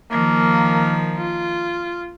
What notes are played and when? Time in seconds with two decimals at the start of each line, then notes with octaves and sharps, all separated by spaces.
0.11 D#3 F3 A#3
1.17 F4